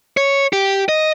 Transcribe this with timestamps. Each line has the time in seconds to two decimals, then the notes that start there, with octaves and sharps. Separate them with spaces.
0.17 C#5
0.53 G4
0.89 D#5